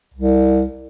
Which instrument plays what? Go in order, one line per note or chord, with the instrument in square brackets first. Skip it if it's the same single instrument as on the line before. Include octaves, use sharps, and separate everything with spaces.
[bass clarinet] C2